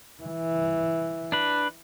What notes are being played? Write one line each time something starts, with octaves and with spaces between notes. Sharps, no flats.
E3
D4 B4